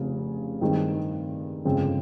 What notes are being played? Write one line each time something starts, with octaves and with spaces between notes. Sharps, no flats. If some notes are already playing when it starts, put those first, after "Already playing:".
Already playing: F1 F2 C#3
G2 D#3 G#3 C4
G1 F2 C#3 G#3 C4